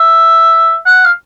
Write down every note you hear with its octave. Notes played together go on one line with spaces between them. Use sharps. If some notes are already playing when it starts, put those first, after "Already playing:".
Already playing: E5
F#5
F5